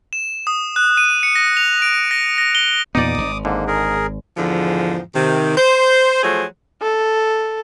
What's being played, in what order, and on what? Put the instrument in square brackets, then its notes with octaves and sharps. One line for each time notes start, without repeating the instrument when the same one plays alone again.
[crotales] E7
D#6
F#6
D#7
C#7
A#6
F7
D7
A#6
A#6
G7
[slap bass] E2 A#2 B3 [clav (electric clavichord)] D#4 D5 [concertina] D6 D#6
[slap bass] G#1
[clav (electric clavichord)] G#2 D3 [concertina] A#3
[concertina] G#4 A#4
[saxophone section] E2 G#2 D3 F3
C3 D#3
C5
F3 F#3 A3 G#4 C5
[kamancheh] A4